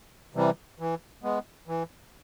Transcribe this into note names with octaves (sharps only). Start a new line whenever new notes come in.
C3 E3 G3
E3
G#3 B3
E3